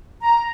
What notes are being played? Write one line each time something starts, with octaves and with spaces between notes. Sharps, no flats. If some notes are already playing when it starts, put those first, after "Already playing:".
A#5